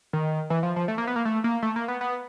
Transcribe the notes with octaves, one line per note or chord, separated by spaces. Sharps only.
D#3
E3
F3
F3
A3
A#3
B3
A#3
A3
A#3
A3
A#3
B3
B3